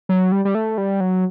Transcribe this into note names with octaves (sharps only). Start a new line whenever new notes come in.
F#3
G3
G3
A3
G3
F#3